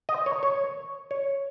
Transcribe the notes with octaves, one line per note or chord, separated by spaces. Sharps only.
D#5
C#5
C#5
C#5